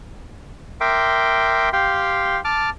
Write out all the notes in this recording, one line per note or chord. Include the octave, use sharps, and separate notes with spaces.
A#4 E5 G5 C6 D6
G4 F5 G5 C6
A5 D6 F6